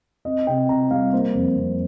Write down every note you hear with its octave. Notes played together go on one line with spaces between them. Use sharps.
C4 D#5
C3 G5
C3 A#5
G3 F5
A#3 C5
F2
F2